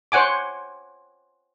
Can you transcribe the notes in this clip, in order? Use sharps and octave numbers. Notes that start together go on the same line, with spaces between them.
C5 C#5 F#5 G#5 D6